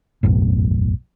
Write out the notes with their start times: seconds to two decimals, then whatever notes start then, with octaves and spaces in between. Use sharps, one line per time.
0.23 E1 B1 F#2 A2